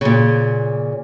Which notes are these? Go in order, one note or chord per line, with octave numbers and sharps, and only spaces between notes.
A#2 C#3